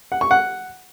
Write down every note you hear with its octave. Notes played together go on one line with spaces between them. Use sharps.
F#5
C#6
F#5